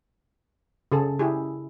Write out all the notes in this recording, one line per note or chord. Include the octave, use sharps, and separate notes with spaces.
C#3 G#4 A4
E4 G4 G#4